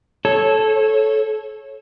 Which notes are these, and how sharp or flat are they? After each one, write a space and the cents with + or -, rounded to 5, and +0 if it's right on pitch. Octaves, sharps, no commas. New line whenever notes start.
A4 -15 C#5 -20